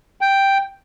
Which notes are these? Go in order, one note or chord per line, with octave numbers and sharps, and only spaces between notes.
G5